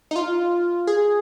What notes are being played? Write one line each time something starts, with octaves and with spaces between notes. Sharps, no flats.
D#4
F4
G#4